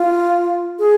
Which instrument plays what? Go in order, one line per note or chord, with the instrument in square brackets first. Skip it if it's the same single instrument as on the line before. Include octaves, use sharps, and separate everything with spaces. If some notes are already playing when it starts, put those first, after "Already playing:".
Already playing: [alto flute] F4
G#4